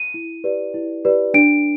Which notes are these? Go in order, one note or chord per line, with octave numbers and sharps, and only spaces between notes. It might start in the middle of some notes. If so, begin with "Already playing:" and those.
Already playing: D#7
E4
G4 B4 D5
E4
G4 B4 D5
D4 D7